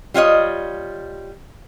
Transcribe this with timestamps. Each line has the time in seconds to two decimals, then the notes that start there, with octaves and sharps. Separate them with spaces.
0.14 G3 F4 C#5 D#5